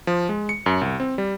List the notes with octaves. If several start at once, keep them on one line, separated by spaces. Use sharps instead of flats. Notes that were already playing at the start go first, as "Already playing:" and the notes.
F3
G#3
C#7
F#2
C2
C4
G3